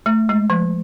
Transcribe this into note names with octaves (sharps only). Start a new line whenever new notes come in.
A3
G#3
F3